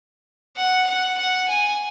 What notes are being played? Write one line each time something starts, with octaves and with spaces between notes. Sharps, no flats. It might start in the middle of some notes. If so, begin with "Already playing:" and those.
F#5
F#5
F#5
G#5